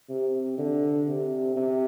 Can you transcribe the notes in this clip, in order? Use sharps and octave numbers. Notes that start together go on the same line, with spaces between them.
C3
D3
C3
C3